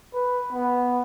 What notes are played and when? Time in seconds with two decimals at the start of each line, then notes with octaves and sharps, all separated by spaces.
0.14 B4
0.52 B3